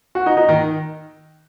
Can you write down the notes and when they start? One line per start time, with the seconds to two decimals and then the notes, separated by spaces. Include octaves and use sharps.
0.15 F#4
0.26 D#4
0.37 D#4
0.48 D#3